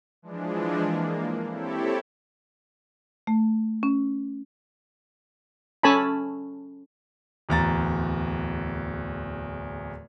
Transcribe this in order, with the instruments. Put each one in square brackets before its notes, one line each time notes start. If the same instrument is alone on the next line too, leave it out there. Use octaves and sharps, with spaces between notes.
[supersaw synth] E3 F3 G#3 D4
A#3
C4 E4 G4 A4 C#5
[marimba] A3
C#4
[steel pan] C#4 A4 C#5 G#5 A5 B5
[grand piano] D1 E2 A#5 A6